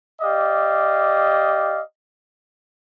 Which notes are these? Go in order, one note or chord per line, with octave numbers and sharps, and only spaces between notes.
G4 D5 D#5 F5